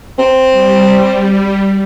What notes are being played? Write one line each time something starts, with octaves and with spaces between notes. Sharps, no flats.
C4
G3